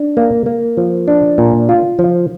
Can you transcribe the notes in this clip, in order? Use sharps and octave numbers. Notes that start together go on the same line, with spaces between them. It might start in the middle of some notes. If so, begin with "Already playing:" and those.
Already playing: D4
A#3
A#3
F3
D4
A#2
F4
F3